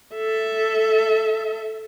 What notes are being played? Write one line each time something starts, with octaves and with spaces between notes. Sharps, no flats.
A4 E5